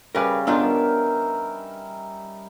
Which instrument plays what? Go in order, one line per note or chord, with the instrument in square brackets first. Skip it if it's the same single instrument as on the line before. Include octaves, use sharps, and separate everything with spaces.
[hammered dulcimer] C#3 G3 [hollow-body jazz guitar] A#4 B4
[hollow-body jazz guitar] B3 D4 F4 [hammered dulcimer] D#4 A#4 E5